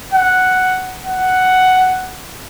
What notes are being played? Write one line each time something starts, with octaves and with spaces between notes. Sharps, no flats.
F#5
F#5